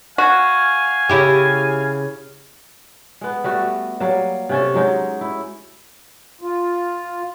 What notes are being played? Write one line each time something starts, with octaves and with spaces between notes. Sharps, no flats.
F#4 F5 G#5
C#3 E4 G4
G#3 B3
G3 A3 F#4
F#3 G3 A#3
C3 C#4 A4
F#3 G#3 D#4
E4
F4